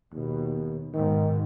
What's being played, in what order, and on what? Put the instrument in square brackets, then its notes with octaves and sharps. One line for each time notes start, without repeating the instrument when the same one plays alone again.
[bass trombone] D#2 [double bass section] B2
[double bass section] G#2 B2 [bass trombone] D#3